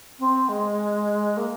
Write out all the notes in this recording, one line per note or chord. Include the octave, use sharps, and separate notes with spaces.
C4
G#3
A#3